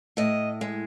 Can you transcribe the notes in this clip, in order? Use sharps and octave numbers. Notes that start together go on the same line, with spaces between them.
A2 D#5
G#3